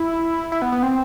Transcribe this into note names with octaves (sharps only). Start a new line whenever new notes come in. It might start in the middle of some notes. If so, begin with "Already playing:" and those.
Already playing: E4
E4
B3
B3
C4